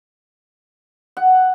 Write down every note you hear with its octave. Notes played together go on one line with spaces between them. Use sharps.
F#5